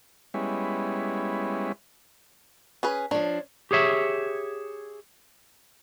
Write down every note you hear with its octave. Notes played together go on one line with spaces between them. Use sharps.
G3 G#3 B3 C#4 E4
C#4 G#4 B4
F3 D4 C#5
G4 G#4 C#5 E5